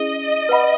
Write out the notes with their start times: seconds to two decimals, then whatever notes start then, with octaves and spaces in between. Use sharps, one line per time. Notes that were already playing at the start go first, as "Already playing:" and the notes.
Already playing: C#4 E4 G#4 D#5
0.49 B4 F#5 B5